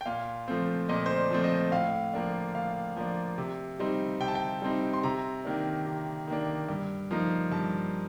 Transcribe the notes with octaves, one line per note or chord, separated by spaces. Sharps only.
G5
A#2 F5
F3 A3 C4
A#2 D#5
C5
D5
F3 A3 C4
D#5
A2 F5
F3 A#3 D4
A2 F5
F3 A#3 D4
C3
G3 C4 D#4
C3 G5
A5
G5
G3 C4 D#4
C6
C3 A#5
D#3 A#3 D4
C3
D#3 A#3 D4
G2
F3 A#3 D#4
G2 A5